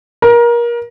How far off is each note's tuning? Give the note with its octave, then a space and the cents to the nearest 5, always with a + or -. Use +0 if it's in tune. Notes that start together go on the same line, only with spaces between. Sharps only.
A#4 +25